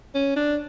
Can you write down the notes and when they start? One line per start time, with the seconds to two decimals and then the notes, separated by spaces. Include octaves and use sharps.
0.14 C#4
0.36 D4